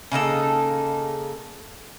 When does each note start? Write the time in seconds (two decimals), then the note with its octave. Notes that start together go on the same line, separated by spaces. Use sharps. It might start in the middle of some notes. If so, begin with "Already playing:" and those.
0.12 C#3 A#3 D#4 A4